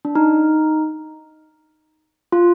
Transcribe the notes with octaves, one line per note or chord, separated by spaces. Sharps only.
D4
D#4
F4